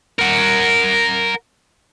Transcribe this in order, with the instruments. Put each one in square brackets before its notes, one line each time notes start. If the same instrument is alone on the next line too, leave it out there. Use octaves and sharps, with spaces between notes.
[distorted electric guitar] A#4 F#5